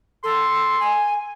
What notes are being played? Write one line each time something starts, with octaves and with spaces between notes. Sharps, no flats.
A4 C6
G#5